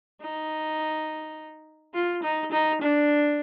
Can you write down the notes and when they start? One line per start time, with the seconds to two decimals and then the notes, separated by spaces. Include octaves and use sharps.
0.21 D#4
1.94 F4
2.23 D#4
2.52 D#4
2.81 D4